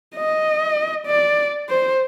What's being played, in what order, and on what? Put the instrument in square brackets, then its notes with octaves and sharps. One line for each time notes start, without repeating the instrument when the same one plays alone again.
[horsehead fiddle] D#5
D5
C5